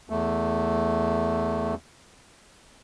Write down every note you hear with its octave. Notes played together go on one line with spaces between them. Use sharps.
E2 A3